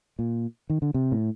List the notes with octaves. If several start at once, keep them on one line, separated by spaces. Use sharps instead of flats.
A#2
D#3
D3
C3
A2